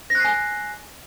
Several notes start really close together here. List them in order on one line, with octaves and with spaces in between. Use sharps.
A#6 F#6 C7 G#5